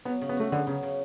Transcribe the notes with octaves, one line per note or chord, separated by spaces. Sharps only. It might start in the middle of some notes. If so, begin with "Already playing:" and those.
F#3 B3
C#3
B3
A3 F#4
D3 B3
C#3 F#3
C#3